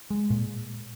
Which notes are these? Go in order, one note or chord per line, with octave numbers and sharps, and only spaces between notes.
G#3
A#2